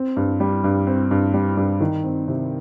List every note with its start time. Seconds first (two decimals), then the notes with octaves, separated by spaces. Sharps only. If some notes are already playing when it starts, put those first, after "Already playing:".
Already playing: C4
0.17 G2
0.40 G3
0.64 G2
0.87 C4
1.11 G2
1.34 G3
1.57 G2
1.81 D#3
2.04 C4
2.28 C3